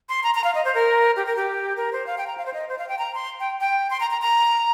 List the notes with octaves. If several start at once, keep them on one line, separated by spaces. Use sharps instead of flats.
C6
A#5
A#5
F5
D#5
C5
A#4
G4
A#4
G4
A#4
C5
F5
G5
A#5
F5
C5
D#5
C5
F5
G5
A#5
C6
G5
G5
C6
A#5
A#5
A#5